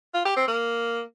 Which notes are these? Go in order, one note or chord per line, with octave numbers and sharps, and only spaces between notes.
F4
G4
C4
A#3